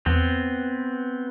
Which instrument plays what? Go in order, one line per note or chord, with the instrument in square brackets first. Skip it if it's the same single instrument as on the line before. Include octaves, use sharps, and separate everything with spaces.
[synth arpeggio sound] E2 [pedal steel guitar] B3 C4